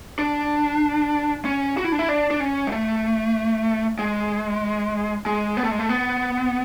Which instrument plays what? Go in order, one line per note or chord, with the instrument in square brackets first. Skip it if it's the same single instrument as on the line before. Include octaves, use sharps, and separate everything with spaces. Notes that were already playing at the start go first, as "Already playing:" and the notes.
[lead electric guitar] D4
C#4
F#4
E4
D4
E4
D4
D4
C#4
G#3
A3
G#3
G#3
B3
A3
G#3
A3
B3